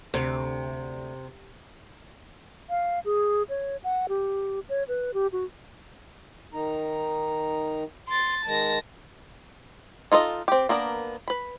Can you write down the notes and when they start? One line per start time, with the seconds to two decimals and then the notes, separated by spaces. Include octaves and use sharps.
0.14 D2 C3
2.70 F5
3.05 G#4
3.49 C#5
3.84 F#5
4.09 G4
4.69 C#5
4.88 B4
5.14 G4
5.32 F#4
6.54 D#3 D#4 A#5
8.08 C6 A6
8.46 D#3 G#3 A5 A#6
10.12 D#4 F4 A4 D#5
10.48 C4 G4
10.69 A#3 B3 D4 A#4
11.28 B4 B5